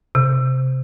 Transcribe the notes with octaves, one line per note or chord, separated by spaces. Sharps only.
C3